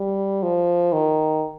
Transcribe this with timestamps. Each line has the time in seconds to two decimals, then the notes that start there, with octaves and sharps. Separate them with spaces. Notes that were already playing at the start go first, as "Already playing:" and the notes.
Already playing: G3
0.43 F3
0.93 D#3